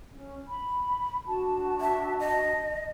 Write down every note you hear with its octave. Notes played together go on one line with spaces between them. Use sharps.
C#4
B5
D4 F#4 A5
E5
D#5